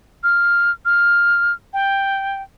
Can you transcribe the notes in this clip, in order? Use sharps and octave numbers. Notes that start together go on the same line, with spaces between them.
F6
F6
G5